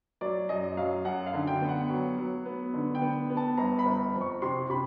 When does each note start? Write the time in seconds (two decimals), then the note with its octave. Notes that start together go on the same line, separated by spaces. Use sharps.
0.21 F#3 D5
0.49 F#2 D#5
0.77 F#3 F5
1.05 F#2 F#5
1.26 F5
1.33 D3
1.47 G5
1.61 B3
1.69 F#5
1.89 F#3
2.18 F#3
2.45 B3
2.74 D3
2.95 G5
3.01 B3
3.30 B3
3.37 A5
3.58 G1 A#5
3.79 B5
3.86 G1
4.14 F2
4.21 C#6
4.42 C3 C6
4.69 C3 B5